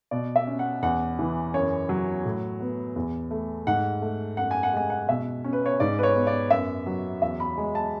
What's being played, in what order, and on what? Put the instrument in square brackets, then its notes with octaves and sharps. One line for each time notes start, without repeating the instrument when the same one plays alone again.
[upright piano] B2 D5
E5
C#4
F#5
E2 F#5
E3
F#2 C#5
F#3
A2
B3
E2
A3
G#2 F#5
A3
F#2 F#5
G#5
F#5
G#3 G#5
F#5
B2 E5
C#4
B4
C#5
G#2 D5
B4
C#5
B3
D5
F#2 E5
F#3
E2 E5
B5
G#3
A5